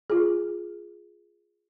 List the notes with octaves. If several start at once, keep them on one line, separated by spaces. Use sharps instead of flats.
F4 G#4